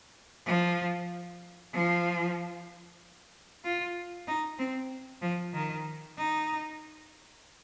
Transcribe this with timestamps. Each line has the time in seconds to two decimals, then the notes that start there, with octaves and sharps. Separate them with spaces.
0.46 F3
1.73 F3
3.64 F4
4.28 D#4
4.59 C4
5.22 F3
5.53 D#3
6.18 D#4